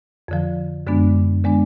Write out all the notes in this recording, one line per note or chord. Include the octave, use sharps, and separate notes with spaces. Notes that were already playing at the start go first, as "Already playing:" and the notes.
F2 D3 F3
F#2 D3 G#3 B3 D4
D3 G#3 B3 D4